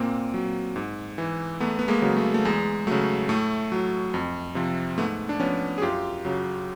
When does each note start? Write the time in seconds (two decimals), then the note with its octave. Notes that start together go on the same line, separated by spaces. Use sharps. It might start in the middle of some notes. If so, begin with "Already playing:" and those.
Already playing: A#2 A#3 C4
0.34 F#3
0.76 G#2
1.18 E3
1.60 E2 A3 B3
1.79 B3
1.88 G#3 A#3
2.02 C#3 F#3
2.17 A3
2.34 A3
2.45 E2 G#3
2.87 C#3 F#3 A3
3.29 A2 A3
3.72 F#3
4.14 F2
4.55 C3 F3
4.97 G#2 A3 B3
5.29 D4
5.40 F3 B3 C#4
5.78 G#4
5.82 F#2 F4 G4
6.25 C#3 F#3